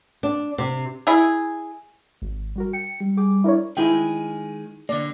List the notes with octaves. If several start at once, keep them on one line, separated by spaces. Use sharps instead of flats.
D4
C3
E4 G#4
G#1
G3 F#4 A#4
G5 C#7
G3
G#4 G5 D6
D4 E4 A#4 C#5 D5
D#3 G#3 E4 G#4 G5
D3 A#3 D5